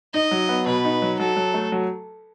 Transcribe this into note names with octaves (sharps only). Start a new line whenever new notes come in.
D#4 D#5
F#3
B3
B2 B4
D#4
F#3
F#3 A4
F#3
A3
F#3